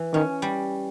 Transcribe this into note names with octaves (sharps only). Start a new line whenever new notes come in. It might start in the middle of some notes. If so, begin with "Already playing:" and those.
Already playing: E3
D#3 C#4
G3